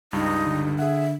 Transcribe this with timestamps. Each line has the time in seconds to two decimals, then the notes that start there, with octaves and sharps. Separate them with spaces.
0.13 C#2 G2 G3 D#4
0.46 D3
0.79 G#4 E5 F#5